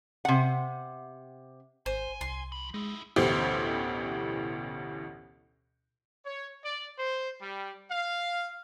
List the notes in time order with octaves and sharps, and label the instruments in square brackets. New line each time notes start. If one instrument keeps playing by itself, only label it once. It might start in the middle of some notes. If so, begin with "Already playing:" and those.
[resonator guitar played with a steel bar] C3 F#5
[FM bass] G#1 [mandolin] C5 [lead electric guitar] G#5
[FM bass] C2 [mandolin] C6
[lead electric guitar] F3 B5
[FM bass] G#3 [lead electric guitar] D#4 E4
[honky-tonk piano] A1 D2 B2 E3 G4 C5
[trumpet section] C#5
D5
C5
G3
F5